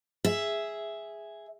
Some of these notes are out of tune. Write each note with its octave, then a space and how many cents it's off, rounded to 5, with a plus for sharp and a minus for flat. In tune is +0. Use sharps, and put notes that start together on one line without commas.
G#4 +0 E5 +0